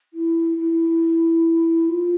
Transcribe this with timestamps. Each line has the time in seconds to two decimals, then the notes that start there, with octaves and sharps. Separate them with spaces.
0.14 E4
0.58 E4
1.89 F4